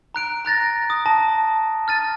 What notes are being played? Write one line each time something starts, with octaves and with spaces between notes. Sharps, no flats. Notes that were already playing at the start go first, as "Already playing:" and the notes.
A#5 F#6 D7
A#5 F#6 A6 A#6
D#6
A5 A#6
F6 A6 D#7